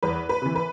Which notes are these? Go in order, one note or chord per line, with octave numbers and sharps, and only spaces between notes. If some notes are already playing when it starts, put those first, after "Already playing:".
E2 B4
B4
C3 E3
B4